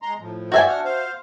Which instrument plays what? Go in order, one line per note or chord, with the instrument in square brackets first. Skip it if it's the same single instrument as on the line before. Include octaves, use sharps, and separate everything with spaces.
[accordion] G#3 A#5 C6
A2 F3
[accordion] G2 D5 G6 [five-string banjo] F#4 E5 G#5
[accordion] D4 F#5 F6
C5 F5